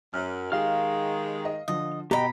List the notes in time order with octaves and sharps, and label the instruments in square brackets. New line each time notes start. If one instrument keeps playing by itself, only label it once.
[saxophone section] F#2 [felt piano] F6
[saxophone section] D#3 G#3 [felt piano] G4 G#4 [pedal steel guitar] F5 F6
[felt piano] D#5
[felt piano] D3 F3 [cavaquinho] D#5
[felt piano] B2 [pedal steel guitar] G4 D#5 G5 [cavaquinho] A#5 B5